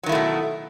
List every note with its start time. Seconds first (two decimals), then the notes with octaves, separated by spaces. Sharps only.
0.03 F#3
0.06 D#3
0.09 E4
0.12 A3
0.15 B2